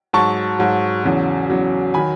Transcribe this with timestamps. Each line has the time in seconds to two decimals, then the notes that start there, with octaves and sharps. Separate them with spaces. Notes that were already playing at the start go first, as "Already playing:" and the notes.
0.13 G#2 F#3 A5 C#6
0.59 G#2 F#3
1.04 E2 C#3 F#3
1.49 E2 C#3 F#3
1.94 D#3 F#3 G#5 B5